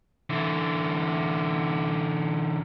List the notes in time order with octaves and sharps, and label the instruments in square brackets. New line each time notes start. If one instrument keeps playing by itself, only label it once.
[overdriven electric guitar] D3 E3